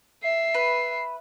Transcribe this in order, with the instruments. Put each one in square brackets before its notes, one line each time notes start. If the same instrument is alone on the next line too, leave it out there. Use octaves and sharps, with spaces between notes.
[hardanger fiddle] E5 [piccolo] C7
[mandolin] B4